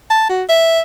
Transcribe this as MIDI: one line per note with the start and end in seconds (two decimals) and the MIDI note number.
0.10 0.27 81
0.29 0.43 66
0.49 0.81 76